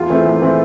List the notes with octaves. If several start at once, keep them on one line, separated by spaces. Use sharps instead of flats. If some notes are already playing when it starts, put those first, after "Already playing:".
Already playing: E2 F4
E3 A3 C4
E2
E3 A3 C4